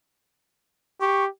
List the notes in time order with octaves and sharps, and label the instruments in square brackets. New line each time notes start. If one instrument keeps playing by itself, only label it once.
[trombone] G4 [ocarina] C#6